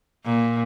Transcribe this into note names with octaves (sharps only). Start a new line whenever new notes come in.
A#2